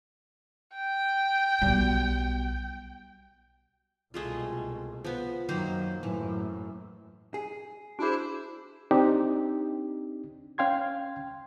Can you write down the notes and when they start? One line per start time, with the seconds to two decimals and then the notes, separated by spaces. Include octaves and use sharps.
0.75 G5
1.62 B1 G3
4.14 C2 B2 G#3 A3 F4
5.04 F3 B3
5.49 F#2 D#3 F#3 A#3 C5
6.03 F#2 A2 E3
7.34 G#4
7.99 D4 E4 F#4 G#4 C5
8.91 C4 D4 D#4 G4
10.58 C#4 F5 G5 C6 G#6